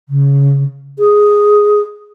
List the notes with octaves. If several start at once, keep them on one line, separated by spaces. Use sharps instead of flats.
C#3
G#4